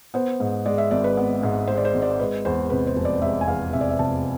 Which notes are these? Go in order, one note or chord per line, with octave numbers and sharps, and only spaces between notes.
B3 C5
G#2
G#3 D5
E5
G#1 D5
B4
B3
G#2
G#3 C5
D5
C5
G#1
D5
G#3 B4
E2 C5
C3 B4
C5
F1
D5
G#3 E5
G#5
E2 F5
C3 E5
D5
E5
F1 A5